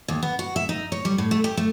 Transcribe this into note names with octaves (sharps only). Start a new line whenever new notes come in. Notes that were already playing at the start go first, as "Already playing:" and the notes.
D#2
B3
F#4
E5
D#4
C#5
G3
A2
A3
G4
A3